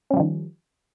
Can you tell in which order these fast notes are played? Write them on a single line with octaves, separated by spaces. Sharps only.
C#4 G3 F3 D#3